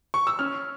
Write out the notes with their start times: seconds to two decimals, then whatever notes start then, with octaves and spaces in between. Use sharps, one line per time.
0.14 C#6
0.27 E6
0.39 C#4 F6